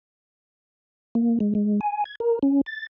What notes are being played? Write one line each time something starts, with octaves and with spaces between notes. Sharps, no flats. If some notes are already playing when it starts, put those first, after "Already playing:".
A#3
G#3
G#3
G#5
G#6
A#4
C#4
A6